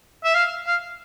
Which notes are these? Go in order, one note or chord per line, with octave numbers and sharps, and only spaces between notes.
E5
F5
F5